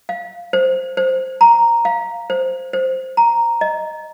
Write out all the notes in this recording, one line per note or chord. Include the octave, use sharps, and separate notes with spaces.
F5
C5
C5
A#5
F5
C5
C5
A#5
D#5